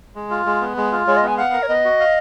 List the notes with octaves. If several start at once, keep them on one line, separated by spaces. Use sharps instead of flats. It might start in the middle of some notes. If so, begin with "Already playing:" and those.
G#3
F4
G#3
B3
G#3
F4
G#3 C#5
D#5
B3 G#5
F5 F#5
A#4
C#5
B3 D#5
F#4
F5